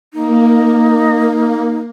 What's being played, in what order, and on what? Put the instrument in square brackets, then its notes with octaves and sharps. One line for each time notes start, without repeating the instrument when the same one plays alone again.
[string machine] A#3 [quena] D#4